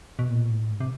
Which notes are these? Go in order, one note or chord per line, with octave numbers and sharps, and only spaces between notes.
B2
A#2
A2
G#2
C3